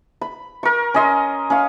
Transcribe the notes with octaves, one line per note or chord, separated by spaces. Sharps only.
B5
A#4 C#6
C#4 D#5 C6
C#4 F5